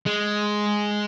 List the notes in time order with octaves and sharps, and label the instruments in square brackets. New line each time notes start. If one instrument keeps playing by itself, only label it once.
[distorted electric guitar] G#3